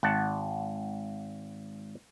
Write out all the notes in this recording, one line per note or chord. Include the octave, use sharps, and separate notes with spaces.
G#1 F#5 A5